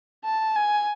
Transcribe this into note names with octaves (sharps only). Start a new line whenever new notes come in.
A5
G#5